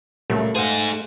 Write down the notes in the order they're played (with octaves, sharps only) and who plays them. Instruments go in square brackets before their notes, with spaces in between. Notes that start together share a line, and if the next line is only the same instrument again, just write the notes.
[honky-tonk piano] C#2 G3 A#4 [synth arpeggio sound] A#2 F#3 [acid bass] A3
[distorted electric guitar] D#4 G#4 [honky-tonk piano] C5 F5 F#5